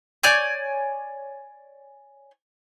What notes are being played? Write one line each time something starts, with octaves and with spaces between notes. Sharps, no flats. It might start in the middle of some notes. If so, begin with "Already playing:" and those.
C#5 D5 G#5 G6